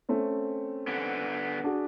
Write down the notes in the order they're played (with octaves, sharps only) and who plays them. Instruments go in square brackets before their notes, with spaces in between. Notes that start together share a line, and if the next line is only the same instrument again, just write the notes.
[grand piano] A3 C4 C#4
[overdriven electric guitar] D3 B3
[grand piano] D4 F#4 G#4